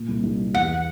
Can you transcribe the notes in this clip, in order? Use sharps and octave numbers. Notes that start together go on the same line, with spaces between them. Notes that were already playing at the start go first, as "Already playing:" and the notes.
Already playing: A#2
C2
C2
G3
E2 F#5